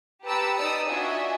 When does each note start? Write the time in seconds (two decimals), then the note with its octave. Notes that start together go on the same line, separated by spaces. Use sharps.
0.25 G4 B4 A5 A#5 E6 C#7
0.58 D#4 D5 D#6 E6
0.89 D4 F4 F#4 D#5 E5 G#5